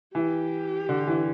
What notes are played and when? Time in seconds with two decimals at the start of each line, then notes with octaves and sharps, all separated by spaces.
0.15 E3 G4
0.89 D3
1.07 E3